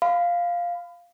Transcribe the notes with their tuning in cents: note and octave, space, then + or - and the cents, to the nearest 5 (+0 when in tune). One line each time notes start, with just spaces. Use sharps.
F5 +0 B5 +30